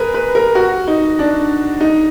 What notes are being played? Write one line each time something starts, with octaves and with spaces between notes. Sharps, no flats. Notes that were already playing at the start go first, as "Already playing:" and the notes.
Already playing: G#4 A#4 B4
B4
A#4
F#4
D#4
D4
D#4